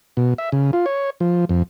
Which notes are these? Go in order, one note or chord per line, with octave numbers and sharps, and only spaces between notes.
B2
E5
C#3
F4
C#5
F3
F2